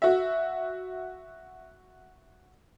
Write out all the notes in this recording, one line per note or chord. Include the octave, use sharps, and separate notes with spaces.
F#4 E5